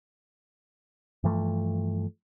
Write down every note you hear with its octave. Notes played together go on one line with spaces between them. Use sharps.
G2 E3 F3 A3